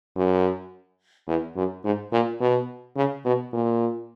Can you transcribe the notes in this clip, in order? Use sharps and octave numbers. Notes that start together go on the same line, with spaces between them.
F#2
E2
F#2
G#2
A#2
B2
C#3
B2
A#2